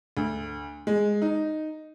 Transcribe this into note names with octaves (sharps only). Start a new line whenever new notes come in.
D2
G#3
D#4